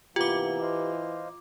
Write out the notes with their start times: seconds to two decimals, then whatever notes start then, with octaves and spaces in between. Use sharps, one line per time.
0.16 C3 E3 A#3 B3 F4 G4 B4 D6
0.62 C5 D#5 F5